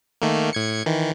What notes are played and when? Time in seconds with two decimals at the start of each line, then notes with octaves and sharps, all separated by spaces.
0.22 D#3 A3 A#3
0.53 A2 G#6 C#7
0.86 D#3 E3